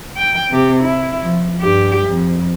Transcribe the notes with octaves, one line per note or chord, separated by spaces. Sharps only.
G5
C3 G4
E4
F3
G2 G4
F2